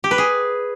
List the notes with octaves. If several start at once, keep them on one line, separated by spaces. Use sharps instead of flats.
G4
B4
G#4